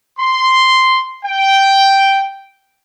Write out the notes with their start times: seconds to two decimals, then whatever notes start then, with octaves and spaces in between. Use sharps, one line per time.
0.19 C6
1.25 G5